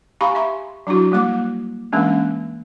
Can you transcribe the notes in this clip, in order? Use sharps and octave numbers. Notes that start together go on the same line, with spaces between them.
G4 F5 G#5 A#5 B5 C#6
E5 C6
F#3 D4 E4 F#4
G3 A#3 D6
E3 G#3 A#3 C#4 D4